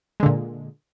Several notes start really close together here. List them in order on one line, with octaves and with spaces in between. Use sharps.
G#3 D3 A#2